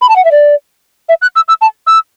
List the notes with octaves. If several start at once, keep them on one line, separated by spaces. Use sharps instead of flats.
B5
A5
F#5
E5
D5
E5
F#6
E6
E6
A5
E6